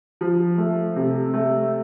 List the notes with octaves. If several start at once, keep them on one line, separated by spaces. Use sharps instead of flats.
F3
A3
C3
A3